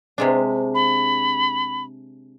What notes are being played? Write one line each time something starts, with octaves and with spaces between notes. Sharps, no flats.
C3 G#3 D4
B5